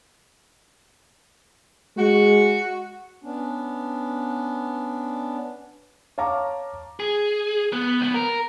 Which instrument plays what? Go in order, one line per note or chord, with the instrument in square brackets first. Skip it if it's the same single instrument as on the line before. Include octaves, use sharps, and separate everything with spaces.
[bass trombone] G#3 [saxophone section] F#4
[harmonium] B3 C#4 D4
[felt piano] C#5 F5 A5 A#5 D6
[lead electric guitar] G#4
B3
C#2 B3
A#4